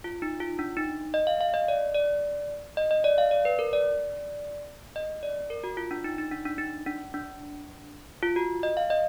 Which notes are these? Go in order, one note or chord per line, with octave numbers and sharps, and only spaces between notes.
F4
D#4
F4
D4
D#4
D#5
F5
F5
D#5
D5
D5
D#5
D#5
D5
F5
D5
B4
A#4
D5
D#5
D5
A#4
F#4
F4
D4
D#4
D#4
D4
D4
D#4
D4
D4
F4
F#4
D#5
F5
D#5